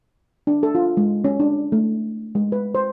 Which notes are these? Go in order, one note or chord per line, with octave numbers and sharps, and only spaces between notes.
D4
A4
F4
G#3
C#4
D4
A3
G#3
B4
C5